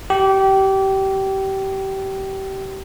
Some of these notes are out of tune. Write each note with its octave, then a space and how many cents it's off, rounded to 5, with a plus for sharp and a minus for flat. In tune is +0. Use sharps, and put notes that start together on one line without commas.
G4 -25